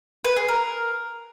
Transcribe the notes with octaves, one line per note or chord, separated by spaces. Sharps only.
B4
G#4
A#4